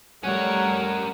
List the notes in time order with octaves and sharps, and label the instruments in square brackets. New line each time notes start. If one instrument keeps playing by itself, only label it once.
[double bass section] G3 [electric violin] A3 C#5 [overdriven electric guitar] C#4 A#4 [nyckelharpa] F#5